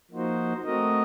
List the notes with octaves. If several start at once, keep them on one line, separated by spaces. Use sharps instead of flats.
F3 A#3 D#4 F#4 C5
A3 C4 F#4 A#4 D#5